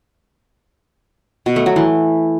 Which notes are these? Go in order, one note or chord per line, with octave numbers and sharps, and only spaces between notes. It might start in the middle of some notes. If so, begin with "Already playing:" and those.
B2
A3
F#3
E3